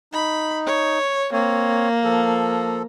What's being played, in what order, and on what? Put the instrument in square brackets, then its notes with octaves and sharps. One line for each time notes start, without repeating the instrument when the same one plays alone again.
[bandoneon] D#4 [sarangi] B5
[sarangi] C#5
[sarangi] A#3 [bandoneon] C4 C#5
[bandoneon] F3 A4